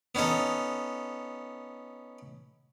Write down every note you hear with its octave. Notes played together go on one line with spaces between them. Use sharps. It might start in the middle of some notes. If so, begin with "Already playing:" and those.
B3 C#4 D#4 A4